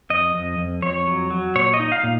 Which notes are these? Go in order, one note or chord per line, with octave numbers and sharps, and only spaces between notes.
F2 D#5
F2
F2
F2 C#5
F#3
F#3
A#2 C#5
D#5
D#4
F5
A#2